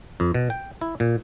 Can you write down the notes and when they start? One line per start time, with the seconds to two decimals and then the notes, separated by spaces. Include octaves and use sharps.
0.20 F2
0.34 B2
0.50 G5
0.81 E4
1.00 A#2